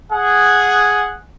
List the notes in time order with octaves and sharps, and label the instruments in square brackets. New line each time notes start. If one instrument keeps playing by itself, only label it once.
[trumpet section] G#4 F#5